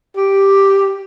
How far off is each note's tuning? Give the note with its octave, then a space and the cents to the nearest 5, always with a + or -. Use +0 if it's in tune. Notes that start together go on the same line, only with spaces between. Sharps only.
G4 +0